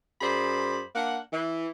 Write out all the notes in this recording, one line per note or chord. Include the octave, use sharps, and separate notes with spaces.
F#2 G#4 C5 D5 B5
A#3 D4 F#5
E3